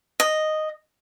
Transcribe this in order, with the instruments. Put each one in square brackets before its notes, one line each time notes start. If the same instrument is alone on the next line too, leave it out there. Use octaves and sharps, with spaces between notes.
[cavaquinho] D#5